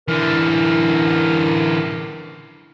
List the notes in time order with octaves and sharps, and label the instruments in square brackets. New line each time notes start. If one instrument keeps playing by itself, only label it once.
[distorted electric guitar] D3 E3 [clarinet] A#4